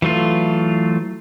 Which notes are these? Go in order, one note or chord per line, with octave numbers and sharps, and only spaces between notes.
E3 F#3 A3 F4